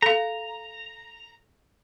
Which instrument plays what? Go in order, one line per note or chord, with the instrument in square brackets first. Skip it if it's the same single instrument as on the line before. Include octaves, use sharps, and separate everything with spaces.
[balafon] A4 F5 [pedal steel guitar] A#5